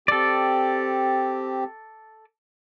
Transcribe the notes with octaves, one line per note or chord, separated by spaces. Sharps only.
C4 G4 A4 D5